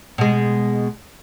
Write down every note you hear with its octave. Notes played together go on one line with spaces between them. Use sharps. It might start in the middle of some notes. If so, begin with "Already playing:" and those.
B2 G#3